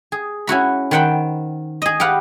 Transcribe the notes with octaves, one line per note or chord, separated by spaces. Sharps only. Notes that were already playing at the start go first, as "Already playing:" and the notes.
G#4
C#4 E4 F#4 B5
D#3 C5 F#5 G5 B5
G#4 D#5
G4 B4 F5 F#5